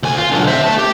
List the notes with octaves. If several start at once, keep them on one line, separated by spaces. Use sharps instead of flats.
D2 G#5
F4
B1 D3
C5 E5
A3 A5
G4